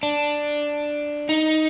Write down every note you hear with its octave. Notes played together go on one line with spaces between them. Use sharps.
D4
D#4